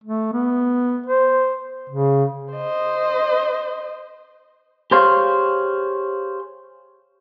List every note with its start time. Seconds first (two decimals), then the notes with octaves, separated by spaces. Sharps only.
0.04 A3
0.33 B3
1.06 C5
1.90 C#3
2.52 C5 D#5
4.91 G4 G#4 C5 C#5 F5